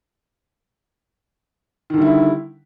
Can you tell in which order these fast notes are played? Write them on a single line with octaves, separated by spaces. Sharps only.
D#3 D3 G3 E4